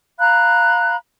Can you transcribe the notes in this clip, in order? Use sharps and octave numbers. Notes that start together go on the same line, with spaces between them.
F5 A#5 B5 F#6